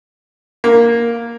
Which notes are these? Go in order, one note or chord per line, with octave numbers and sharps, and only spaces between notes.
A#3